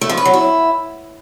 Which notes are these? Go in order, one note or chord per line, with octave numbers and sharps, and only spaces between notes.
A3
F3
B4
F#3
E4